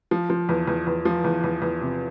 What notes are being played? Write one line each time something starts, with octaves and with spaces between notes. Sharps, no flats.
F3
F3
E2
E2
E2
F3
E2
E2
E2
C3